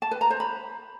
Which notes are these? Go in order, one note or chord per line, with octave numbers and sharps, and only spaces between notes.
A5
B4
A#5
C5
B5